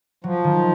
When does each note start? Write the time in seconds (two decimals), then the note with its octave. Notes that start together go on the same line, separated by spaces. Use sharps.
0.24 F3 F#3
0.44 D#3